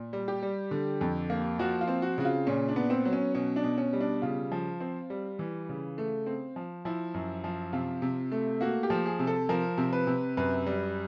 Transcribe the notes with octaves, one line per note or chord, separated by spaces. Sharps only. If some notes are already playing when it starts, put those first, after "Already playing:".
Already playing: A#2
G3
G4
G3
D3
F2
A#3
F3 F#4
F4
C4
F#4
C#3 F#4
F4
A#2 C#4
D4
B3
C4
F#3
C#4
B2 C#4
D4
B2
C#4
G3
D4
C#3 F4
F3
C4
G3
E3
C#3
A3
C4
F3
F3 E4
F#2
F3
C3 F4
C3
A3
A#3 F#4
G4
F3
G#4
C3
A4
F3 A#4
C3
B4
C3
F#2 B4
G3